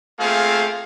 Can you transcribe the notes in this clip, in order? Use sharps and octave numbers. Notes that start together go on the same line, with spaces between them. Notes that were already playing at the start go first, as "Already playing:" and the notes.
A3 A#3 C4 F4 G#4 F5